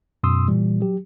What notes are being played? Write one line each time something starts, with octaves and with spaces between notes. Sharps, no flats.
F#2 B2 C6 D#6 E6
A#2 E3 G3
F#3 G4